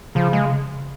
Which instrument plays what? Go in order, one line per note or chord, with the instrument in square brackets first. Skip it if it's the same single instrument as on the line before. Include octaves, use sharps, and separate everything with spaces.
[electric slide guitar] C#3 [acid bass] F3
[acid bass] G#3